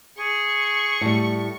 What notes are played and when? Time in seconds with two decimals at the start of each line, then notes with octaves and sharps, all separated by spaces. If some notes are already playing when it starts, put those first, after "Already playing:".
0.18 G#4 C#6
1.01 A2 G3